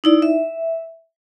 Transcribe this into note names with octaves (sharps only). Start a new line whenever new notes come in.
D#4 E4 D5
E5